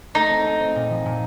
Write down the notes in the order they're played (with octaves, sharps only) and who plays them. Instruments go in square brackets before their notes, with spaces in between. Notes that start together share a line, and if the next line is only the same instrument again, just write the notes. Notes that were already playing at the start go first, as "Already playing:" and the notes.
[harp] A3 [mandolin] D#4
[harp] C4
C4
C4
A#2
F3
A#2